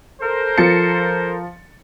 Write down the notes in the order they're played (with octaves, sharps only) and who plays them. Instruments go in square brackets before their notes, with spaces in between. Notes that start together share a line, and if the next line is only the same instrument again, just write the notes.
[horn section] A4 A#4 C5
[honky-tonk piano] F3 A6 C#7